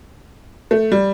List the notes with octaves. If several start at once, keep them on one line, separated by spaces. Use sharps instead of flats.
A3
G3